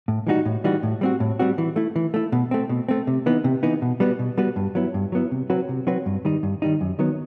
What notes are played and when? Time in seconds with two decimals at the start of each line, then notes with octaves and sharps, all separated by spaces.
0.08 A2
0.27 E3 G3 D#4 F#4
0.45 A2
0.64 E3 G3 D#4 F#4
0.83 A2
1.01 G3 C4 F#4
1.20 A2
1.39 G3 C4 F#4
1.58 E3
1.76 A3 E4
1.96 E3
2.14 A3 E4
2.32 B2
2.51 A3 C4
2.69 B2
2.89 A3 C4
3.07 C3
3.26 E3 B3 D#4
3.44 C3
3.63 E3 B3 D#4
3.82 B2
4.00 G3 B3 F#4 B4
4.19 B2
4.38 G3 B3 F#4 B4
4.56 G2
4.75 F#3 B3 E4
4.94 G2
5.12 F#3 B3 E4
5.32 C3
5.50 F#3 C4 F#4 B4
5.69 C3
5.87 F#3 C4 F#4 B4
6.06 G2
6.25 D#3 G3 D#4
6.43 G2
6.62 D#3 G3 D#4
6.81 F#2
6.99 D#3 F#3 B3